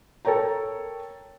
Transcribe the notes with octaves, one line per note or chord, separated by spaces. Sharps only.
A4 A#4 C#5 G5 A#5